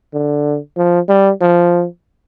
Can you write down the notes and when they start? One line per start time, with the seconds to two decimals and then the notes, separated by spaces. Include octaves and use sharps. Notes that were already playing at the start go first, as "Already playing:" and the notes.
0.14 D3
0.77 F3
1.09 G3
1.41 F3